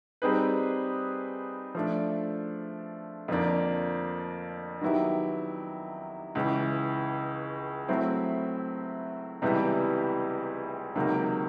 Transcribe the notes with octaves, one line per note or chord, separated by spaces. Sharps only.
G3 C4 D#4 G#4 B4
F3 A3 D4
F2 D3 F3 A#3 D4
D#3 F#3 B3 E4 G4
C#2 C#3 E3
F#3 A3 C4 E4
C#2 C3 E3 G3 B3
C#2 C3 D#3 F#3 A#3